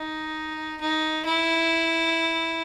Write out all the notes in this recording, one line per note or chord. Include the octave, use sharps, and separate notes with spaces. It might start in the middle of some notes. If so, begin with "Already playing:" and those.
Already playing: D#4
D#4
E4